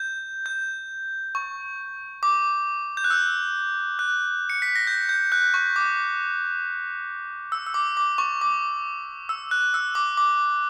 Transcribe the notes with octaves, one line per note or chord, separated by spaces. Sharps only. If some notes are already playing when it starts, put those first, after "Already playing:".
Already playing: G6
G6
C#6
D6
G6
F#6
E6
F#6
C#7
B6
A#6
G6
G6
F#6
C#6
D6
E6
E6
D6
D6
C#6
D6
E6
F#6
E6
D6
D6